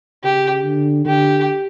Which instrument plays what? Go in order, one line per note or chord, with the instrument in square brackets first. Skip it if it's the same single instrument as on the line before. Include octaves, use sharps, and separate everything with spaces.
[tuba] C#3 [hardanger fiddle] G4
[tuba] D3
[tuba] D3 [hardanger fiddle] G4